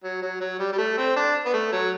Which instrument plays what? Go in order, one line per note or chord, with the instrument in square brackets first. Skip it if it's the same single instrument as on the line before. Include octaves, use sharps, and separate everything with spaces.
[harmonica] F#3
F#3
F#3
G3
G3
A3
C4
D4
B3
A3
F#3